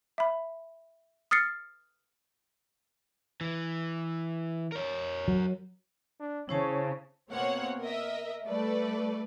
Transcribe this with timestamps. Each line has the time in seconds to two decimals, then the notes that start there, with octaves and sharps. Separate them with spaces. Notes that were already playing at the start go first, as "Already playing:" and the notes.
0.18 E5 B5
1.31 D#6 F6 A6 C7 C#7
3.41 E3
4.72 A#4 C#5
5.28 F#3
6.20 D4
6.49 C#3 E4 C5 C#5 A5
7.31 B2 A#3 C4 C#5 F#5
7.80 A#4 D#5 E5
8.46 G3 A3 A4 B4 D5